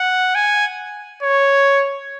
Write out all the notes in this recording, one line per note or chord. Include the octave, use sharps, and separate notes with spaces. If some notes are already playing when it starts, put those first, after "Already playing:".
Already playing: F#5
G#5
C#5